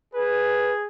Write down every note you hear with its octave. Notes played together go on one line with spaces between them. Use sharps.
G#4 B4